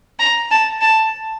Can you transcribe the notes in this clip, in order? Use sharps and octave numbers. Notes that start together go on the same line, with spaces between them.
A#5
A5
A5